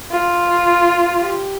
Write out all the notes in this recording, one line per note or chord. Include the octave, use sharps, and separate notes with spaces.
F4
G4